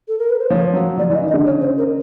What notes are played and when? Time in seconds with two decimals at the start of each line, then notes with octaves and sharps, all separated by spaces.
0.08 A4
0.19 A#4
0.30 B4
0.39 C5
0.50 F3 C#5
0.74 F#3
0.97 F3 D5
1.10 E3 D#5
1.22 D#3
1.30 D#5
1.34 D3
1.46 C#3 C#5
1.61 C5
1.78 A#4